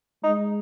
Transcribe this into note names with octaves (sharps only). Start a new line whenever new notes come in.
G#3 D#4